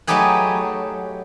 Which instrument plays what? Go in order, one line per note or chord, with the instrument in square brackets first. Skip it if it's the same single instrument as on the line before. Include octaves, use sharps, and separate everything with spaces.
[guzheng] F#3 A3 D#4 G4 G#4 B4